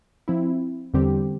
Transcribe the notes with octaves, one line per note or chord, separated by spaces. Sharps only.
F3 C4 E4
E2 D3 G3 C4 G4